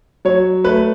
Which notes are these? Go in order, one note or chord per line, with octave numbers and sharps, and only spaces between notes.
F#3 C#5
A3 B4